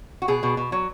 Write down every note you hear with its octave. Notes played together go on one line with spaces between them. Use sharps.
F#4
B2 G#4
B2
B2
F#3